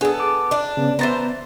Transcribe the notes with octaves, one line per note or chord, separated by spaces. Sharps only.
B3 D4 G#4 A4
D6
D4 D5
C#3 B3
E3 B3 C5 A#5 A6